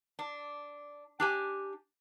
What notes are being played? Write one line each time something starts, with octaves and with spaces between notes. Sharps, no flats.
D4
D4 G4 G#5